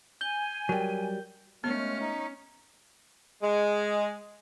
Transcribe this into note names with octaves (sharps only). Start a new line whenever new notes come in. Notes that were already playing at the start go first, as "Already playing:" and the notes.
G#5 G6 G7
F#3 G3 A#4 G5
D#2 G#3 A3 B3 C#4 F6
D#4
G#3